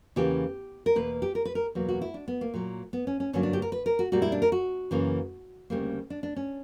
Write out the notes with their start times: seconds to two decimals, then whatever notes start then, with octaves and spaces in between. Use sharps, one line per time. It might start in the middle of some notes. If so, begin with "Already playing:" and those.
0.16 E2 C#3 E3 A#3 G4
0.86 A#4
0.95 E2 B2 A#3 B4
1.22 G4
1.35 A#4
1.45 B4
1.55 A#4
1.75 E2 B2 F#3 A#3
1.89 F#4
2.02 E4
2.14 D4
2.28 B3
2.41 A#3
2.54 A#2 F#3 A#3
2.93 B3
3.07 C#4
3.20 C#4
3.33 G2 D3 F#3 A#3 C#4
3.43 D4
3.53 G4
3.62 A#4
3.72 B4
3.86 A#4
3.99 F#4
4.12 A#2 G3 A#3 F#4
4.22 E4
4.32 D4
4.42 A#4
4.52 F#4
4.91 F#2 C#3 E3 A#3
5.70 D2 C#3 G3 A#3
6.10 D4
6.23 D4
6.36 C#4